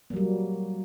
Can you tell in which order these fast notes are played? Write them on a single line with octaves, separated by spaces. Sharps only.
A#3 F#3 G3